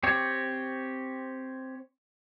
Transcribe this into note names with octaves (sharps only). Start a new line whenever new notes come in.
C4 G4 C#5